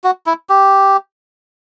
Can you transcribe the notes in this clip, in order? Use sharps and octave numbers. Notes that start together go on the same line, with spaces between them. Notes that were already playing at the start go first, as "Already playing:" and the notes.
F#4
E4
G4